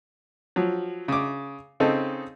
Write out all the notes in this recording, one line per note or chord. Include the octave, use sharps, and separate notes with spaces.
F3 F#3
C#3 D6
C#3 C4 D#4 A4